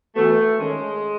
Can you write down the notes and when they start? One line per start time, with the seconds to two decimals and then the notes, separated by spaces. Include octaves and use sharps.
0.16 E3 A3 B3 F#4
0.59 D#3 G#3 A3 C#4